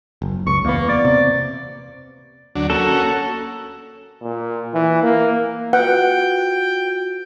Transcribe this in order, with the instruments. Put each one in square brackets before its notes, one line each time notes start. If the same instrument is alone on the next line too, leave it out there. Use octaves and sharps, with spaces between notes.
[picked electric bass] F#1
[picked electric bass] C#2 [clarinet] C#6
[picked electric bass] E2 B3 [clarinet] A#3
[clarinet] D5
[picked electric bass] C3
[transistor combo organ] D2 F#3 D4
[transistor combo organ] A#3 C#4 F#4 [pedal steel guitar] A4
[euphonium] A#2
E3
A#3
[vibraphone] F4 F#4 [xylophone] B4 [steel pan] F#5 [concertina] G5